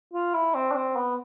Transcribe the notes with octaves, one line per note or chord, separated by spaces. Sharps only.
F4
E4
C4
D4
C4
B3